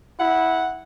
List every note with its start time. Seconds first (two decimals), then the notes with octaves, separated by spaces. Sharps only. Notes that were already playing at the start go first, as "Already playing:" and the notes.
0.20 E4 F#5